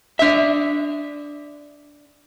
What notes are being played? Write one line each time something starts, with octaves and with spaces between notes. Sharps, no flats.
D4 E5